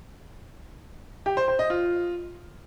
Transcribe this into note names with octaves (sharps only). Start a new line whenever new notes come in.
G4
C5
C5
D#5
F4